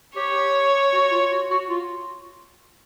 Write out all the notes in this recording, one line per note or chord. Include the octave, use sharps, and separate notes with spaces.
G4 C#5
F#4
F4
F#4
F#4
F4